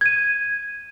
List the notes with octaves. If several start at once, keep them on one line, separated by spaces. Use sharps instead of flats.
G#6 D#7